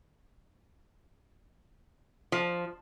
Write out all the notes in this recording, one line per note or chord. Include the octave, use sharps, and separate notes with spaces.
F3